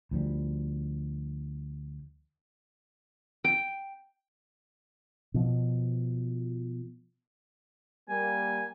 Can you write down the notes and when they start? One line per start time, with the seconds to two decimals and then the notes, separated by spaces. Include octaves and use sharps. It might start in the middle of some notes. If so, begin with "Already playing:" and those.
0.11 D2 F3 G3
3.44 G5
5.34 B2 F3
8.09 G3 A#3 G#5